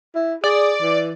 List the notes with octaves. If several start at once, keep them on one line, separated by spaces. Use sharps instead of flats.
E4
G#4 D5
E3